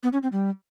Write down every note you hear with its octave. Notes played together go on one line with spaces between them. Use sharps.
B3
C#4
C4
G3